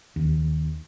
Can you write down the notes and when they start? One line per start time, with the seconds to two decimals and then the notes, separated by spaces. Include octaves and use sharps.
0.16 D#2